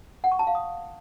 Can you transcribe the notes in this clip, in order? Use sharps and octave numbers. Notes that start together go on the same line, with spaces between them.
F#5
C#6
A5
F5
D#6